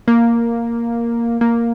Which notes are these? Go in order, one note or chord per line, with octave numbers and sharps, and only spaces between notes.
A#3
A#3